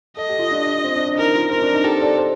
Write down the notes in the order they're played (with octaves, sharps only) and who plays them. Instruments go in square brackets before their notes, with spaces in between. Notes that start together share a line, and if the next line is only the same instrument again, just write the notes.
[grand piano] A4 [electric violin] D#5
[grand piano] G4
F4
D4
C4
D4
D4
[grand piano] D#4 [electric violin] A#4
[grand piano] F4
[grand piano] C4 [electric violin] A#4
[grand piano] D4
D#4
[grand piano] G4 [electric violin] A4
[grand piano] C5
D5
C5